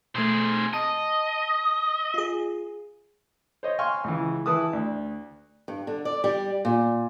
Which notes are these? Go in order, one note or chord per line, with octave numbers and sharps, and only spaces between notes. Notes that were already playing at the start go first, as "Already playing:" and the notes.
B2 A3 C4 G#4
D#5 A5
F4 G#4
C5 C#5 D#5
F5 G5 G#5 C6 C#6 F6
C#2 C#3 E3
E3 E4 B4 A5 D#6
D2
G2
D3
D5
G3
A#2